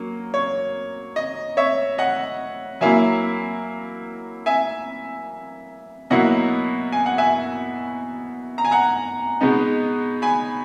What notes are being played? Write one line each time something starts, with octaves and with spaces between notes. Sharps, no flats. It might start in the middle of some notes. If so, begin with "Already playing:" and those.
Already playing: F#3 A#3 C#4
C#5
D#5
C#5 E5
D#5 F#5
F#3 A#3 E4 E5 G#5
E5 G#5
B2 F#3 A#3 E4 D#5 F#5
G#5
F#5
E5 G#5
A#5
G#5
F#5 A#5
B2 G#3 B3 D#4
G#5 B5